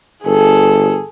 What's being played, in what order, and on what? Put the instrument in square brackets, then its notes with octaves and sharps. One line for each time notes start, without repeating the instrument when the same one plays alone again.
[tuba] G1 [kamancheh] G#4 A4